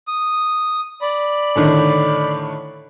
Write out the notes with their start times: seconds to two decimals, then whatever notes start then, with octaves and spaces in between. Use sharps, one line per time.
0.08 D#6
1.02 D5 B5
1.56 A2 D3 D#3